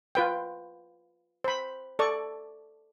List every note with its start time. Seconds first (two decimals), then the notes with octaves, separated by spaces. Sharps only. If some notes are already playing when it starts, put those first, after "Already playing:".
0.15 F4 B4 G5
1.44 C5 B5
1.99 A4 D5 C#6